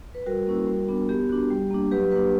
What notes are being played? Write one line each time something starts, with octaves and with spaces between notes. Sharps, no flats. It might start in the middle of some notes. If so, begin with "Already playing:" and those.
B4
G3 F#4 A#4
A#3 C#4 E4
G3
B3 D4 F#4
B3 G4
D4 F#4
G3
A#3 D4
F#3 G4 B4
A#3 D4 G4 B4